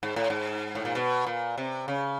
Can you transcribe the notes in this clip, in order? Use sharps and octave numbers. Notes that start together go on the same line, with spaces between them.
G#2
A2
G#2
A2
A#2
B2
A#2
C3
C#3